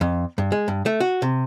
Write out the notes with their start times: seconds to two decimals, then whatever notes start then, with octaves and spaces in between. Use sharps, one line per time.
0.01 F2
0.38 G2
0.52 G#3
0.68 G2
0.86 A3
1.00 F#4
1.22 C3